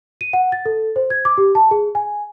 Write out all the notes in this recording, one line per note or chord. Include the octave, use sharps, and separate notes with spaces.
D#7
F#5
A6
A4
C5
G#6
D6
G4
A5
G#4
G#5